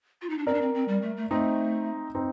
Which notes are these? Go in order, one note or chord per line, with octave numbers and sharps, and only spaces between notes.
F4
D#4
D4
C4 A#4 D5
D4
C4
C4
G3
A3
A3
A3 C4 D#4
C4 D#4